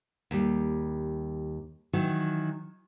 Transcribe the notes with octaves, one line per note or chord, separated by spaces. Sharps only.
D#2 G3
D#3 E3 F#3